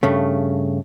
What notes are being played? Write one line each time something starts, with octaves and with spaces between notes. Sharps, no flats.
G2 C#3 A3